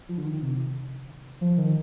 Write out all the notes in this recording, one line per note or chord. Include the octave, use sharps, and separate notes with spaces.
F3
D3
D#3
C3
F3
D#3